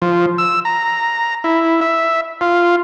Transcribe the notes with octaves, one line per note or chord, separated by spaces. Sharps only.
F3
E6
A#5
E4
E5
F4